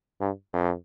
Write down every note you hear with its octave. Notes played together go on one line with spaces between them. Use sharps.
G2
F2